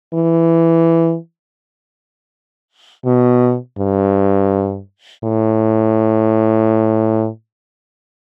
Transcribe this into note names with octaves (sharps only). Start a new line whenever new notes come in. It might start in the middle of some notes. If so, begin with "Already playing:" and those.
E3
B2
G2
A2